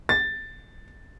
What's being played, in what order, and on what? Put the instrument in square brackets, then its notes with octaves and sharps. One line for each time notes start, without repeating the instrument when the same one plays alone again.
[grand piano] A6